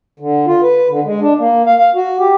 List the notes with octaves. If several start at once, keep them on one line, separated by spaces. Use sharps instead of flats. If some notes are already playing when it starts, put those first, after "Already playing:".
D3
F4
B4
D3
G#3
D4
A#3
F5
F5
F#4
G4